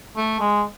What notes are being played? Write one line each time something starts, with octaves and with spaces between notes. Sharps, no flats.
A3
G#3